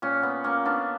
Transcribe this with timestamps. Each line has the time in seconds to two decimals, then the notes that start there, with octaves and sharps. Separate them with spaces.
0.02 A#2 C#4
0.23 B3
0.44 A#3 C#4
0.65 B3 D4